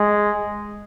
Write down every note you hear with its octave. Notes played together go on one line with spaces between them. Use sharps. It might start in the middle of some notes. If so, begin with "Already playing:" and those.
Already playing: G#3